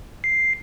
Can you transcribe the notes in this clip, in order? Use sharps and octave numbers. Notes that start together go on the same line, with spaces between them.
C7